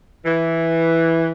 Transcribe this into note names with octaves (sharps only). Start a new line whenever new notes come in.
E3